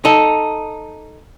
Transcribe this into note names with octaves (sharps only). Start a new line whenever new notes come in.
D#4 A4